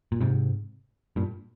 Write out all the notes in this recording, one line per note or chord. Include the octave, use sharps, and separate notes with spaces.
A#2
G#2 C3
G2 A#2